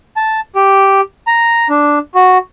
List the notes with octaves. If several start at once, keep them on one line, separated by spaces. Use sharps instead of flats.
A5
G4
A#5
D4
F#4